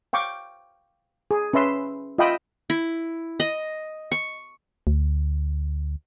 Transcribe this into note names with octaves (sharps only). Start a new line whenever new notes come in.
F5 G5 C#6 D6
G#4
C#4 B4 E5 C6 E6
F4 D#5 E5 G5 B5 D#6
E4
D#5
C#6
D2